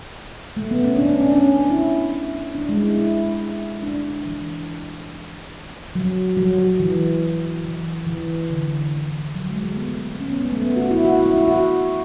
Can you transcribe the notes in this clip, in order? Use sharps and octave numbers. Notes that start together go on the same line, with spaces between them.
A3
B3
C#4
D4
C#4
D4
C#4
E4
D4
G#3
E4
E4
D4
E3
F#3
F#3
F#3
E3
E3
E3
D3
E3
F#3
G#3
A3
B3
C#4
B3
B3
A3
B3
F#4
E4
F#4
E4
E4
E4
F#4